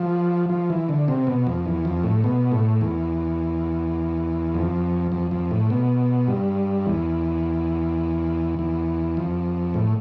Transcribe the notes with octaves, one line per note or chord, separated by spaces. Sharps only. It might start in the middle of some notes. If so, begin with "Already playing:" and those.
Already playing: F3
F3
E3
D3
C3
B2
F2
E2
F2
A2
B2
A2
E2
F2
F2
F2
A2
B2
G2
E2
E2
F2
A2